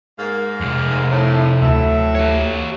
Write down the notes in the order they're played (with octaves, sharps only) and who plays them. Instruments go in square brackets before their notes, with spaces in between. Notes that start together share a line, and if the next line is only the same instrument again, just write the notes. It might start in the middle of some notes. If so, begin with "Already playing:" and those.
[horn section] G#2 A#3 F5
[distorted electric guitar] F2 C3
[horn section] A2
[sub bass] D2 [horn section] A2 F#3 E5
[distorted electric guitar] G4 C#5